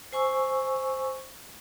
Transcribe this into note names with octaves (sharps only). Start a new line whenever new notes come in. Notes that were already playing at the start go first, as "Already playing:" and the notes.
C5 G#5 C#6 E6